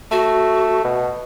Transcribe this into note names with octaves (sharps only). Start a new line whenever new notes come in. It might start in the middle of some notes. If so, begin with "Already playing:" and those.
A3 F#4
B2